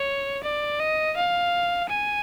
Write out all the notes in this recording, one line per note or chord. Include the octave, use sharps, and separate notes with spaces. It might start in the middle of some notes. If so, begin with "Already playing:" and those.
Already playing: C#5
D5
D#5
F5
G#5